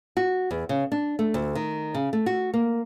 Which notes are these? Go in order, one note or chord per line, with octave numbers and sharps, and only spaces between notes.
F#4
E2
C#3
D4
A3
D2
D#3
C#3
A3
F#4
A#3